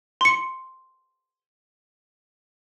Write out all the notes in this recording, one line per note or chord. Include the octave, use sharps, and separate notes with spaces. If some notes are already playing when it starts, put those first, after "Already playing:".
C6 C#7